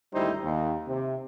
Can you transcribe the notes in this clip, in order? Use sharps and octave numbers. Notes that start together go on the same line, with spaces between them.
G#1 D2 G3 D#4 E4 C5
D#2
C3